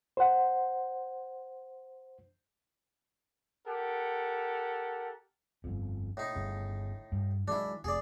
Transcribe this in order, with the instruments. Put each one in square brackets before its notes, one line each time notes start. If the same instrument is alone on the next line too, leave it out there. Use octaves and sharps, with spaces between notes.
[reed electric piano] C5 F#5
[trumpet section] G4 A4 A#4 F#5
[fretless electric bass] G1 F2
[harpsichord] A2 D#4
[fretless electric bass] G1 C#3
G2
[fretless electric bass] D#3 F#3 G#3 [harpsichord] D4 E4
[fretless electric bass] F1 [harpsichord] G#4 D5